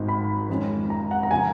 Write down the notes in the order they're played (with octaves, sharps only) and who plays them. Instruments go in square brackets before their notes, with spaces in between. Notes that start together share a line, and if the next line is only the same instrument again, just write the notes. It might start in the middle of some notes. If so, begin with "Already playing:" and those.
Already playing: [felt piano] G#1 G#2 D#3
[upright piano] B5
[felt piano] F2 D#3 G#3 C#4
[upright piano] A#5
F#5
A#5
[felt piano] C#3 F3 B3 [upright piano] G#5